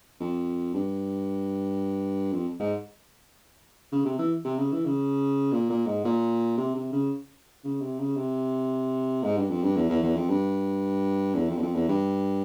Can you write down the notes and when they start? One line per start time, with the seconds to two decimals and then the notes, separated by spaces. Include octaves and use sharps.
0.20 F2
0.74 G2
2.32 F2
2.60 G#2
3.92 C#3
4.05 C3
4.18 E3
4.45 C3
4.58 C#3
4.72 E3
4.85 C#3
5.52 A#2
5.70 A#2
5.86 G#2
6.04 A#2
6.57 C3
6.75 C3
6.92 C#3
7.64 C#3
7.81 C3
7.99 C#3
8.16 C3
9.23 G#2
9.37 G2
9.49 F2
9.63 G2
9.76 E2
9.89 E2
10.03 E2
10.16 F2
10.29 G2
11.35 E2
11.49 F2
11.58 E2
11.62 F2
11.75 E2
11.88 G2